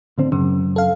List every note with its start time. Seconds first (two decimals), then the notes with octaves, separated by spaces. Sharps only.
0.18 A2 D3 C4
0.32 F#2 C#3
0.76 A4 F5